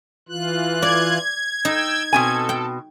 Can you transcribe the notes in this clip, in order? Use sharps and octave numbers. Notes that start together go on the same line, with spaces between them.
E3 F4 F#6
D5 G#6
D#4 G5 E6
B2 C4 A4 G#5
G5